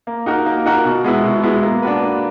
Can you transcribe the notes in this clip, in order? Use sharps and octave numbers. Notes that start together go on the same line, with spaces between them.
A#3
D#4 F#4 A#4
A#3
D#4 F#4 A#4
B2
G#3 B3 E4
B2
G#3 B3 E4
A#3
D4 F#4 B4
A#3